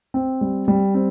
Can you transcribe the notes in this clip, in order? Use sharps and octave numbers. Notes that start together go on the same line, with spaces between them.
C4
G3
G3
C4